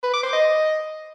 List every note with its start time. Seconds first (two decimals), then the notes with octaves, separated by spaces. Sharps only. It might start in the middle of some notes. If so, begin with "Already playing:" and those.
0.03 B4
0.13 D6
0.23 C5
0.33 D#5